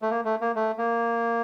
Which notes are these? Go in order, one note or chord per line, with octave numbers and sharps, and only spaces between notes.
A3
A#3
A3
A#3
A3
A#3